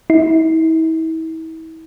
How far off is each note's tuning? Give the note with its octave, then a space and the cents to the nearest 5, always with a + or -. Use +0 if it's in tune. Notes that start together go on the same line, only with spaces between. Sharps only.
E4 -40